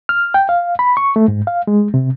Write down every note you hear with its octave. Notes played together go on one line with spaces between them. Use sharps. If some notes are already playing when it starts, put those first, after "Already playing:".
F6
G5
F5
B5
C#6
A3
G#2
F5
G#3
C3